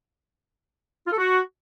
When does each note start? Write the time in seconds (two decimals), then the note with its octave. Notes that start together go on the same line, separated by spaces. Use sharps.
1.06 F4
1.12 A4
1.18 F#4